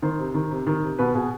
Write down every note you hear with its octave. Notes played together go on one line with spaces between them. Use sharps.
D#3 C5
C3
D#3
C3
D#3
C3
B2 B4
B2 G#4